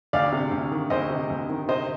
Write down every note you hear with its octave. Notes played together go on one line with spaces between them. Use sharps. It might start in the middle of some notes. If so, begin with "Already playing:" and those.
D2 D5 F5
C3
D2
D#3
D2 C5 D#5
C3
D2
D#3
C3 C5 D#5